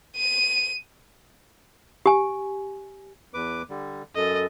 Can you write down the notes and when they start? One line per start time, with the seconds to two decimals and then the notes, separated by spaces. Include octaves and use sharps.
0.17 D#7
2.06 G4 G#5
3.34 E2 B4 D6
3.70 D3 G3
4.15 F#2 A4 D#5